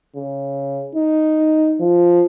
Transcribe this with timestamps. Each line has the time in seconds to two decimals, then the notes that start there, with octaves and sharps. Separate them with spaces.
0.16 C#3
0.95 D#4
1.80 F3